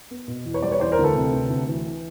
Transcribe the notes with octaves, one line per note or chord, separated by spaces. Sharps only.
B3
B2
E2
B4 C#5
G3 C5 D5
B4 C#5
E3 C5 D5
A#4 C5
D2
A4 B4
C3
D2
D2
E3